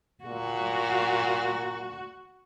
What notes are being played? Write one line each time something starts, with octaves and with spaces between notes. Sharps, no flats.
A#2 F#4